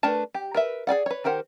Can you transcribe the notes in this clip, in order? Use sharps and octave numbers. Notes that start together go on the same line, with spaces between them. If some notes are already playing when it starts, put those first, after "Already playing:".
A3 D4 A#4 B4 A5
G4
A#4 B4 E5
G#4 B4 D5 F#5
B4 C#5
D#3 G4 A#4 C5 F#5